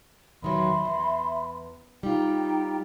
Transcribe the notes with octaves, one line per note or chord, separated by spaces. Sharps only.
E2 D#3 F#3 E5 B5 C6
E2
G3 D#4 F4 G5